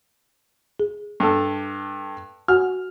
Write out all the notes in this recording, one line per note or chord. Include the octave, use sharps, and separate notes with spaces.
G#4
G2 A4
F#4 F#5 G#5 F6